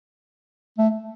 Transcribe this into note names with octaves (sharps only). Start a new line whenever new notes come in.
A3